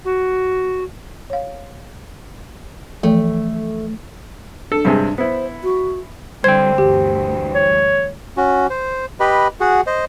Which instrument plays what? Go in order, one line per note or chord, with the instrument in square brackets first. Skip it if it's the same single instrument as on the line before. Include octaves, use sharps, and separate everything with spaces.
[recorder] F#4
[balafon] C#5 F5
[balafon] E3 F3 G5 [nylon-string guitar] A3
[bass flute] D4 [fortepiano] A4
[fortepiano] G2 C3 G#3
[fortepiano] B3 E4 [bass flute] C5
[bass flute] F#4
[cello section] D3 G3 [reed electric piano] C5 G5 [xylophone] G#6
[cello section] D2 G2 E3 [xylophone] G4
[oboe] C#5
[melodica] C#4 F#4
C5
G4 B4 D#5 B5
F#4 G#4 F#5
C5 D#5